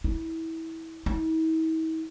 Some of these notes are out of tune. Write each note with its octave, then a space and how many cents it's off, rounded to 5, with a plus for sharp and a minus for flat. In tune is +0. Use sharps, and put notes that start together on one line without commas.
E4 -25
E4 -45